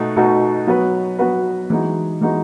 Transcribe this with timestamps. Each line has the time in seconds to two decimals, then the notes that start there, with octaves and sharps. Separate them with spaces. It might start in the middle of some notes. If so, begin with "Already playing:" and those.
Already playing: B2 A3 D#4 F#4
0.16 B2 A3 D#4 F#4
0.67 F#3 B3 F#4 B4
1.19 F#3 B3 F#4 B4
1.70 E3 G#3 D#4 F#4
2.21 E3 G#3 D#4 F#4